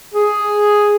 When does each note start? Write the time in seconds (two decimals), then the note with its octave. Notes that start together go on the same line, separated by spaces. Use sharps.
0.14 G#4